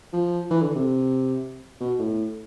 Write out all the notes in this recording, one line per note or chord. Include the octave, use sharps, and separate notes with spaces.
F3
E3
D3
C3
B2
A2